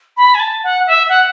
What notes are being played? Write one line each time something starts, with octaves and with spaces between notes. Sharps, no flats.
B5
G#5
A5
F#5
E5
F#5